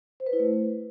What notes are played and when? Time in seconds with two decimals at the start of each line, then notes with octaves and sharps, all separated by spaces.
0.20 C5
0.26 B4
0.33 E4
0.39 A3